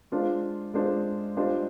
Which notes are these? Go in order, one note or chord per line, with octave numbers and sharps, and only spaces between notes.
G#3 D4 F4 C5
G#3 D4 F4 C5
G3 D4 F4 C5 D#5